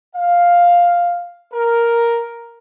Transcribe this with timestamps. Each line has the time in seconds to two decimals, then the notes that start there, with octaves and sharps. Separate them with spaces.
0.16 F5
1.54 A#4